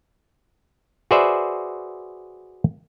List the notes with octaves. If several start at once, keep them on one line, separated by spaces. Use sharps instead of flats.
F#4 G#4 B4 C5 D5 E5